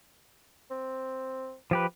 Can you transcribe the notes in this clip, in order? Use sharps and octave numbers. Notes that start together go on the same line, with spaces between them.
C4
F3 G4 B4